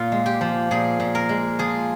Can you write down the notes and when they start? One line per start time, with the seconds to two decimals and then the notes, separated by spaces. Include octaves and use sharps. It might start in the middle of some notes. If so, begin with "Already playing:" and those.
Already playing: A#2 F4
0.12 G#3
0.26 G4
0.41 F3
0.71 A#2 G#4
1.00 A#2
1.15 A#4
1.29 G#3
1.59 F3 G#4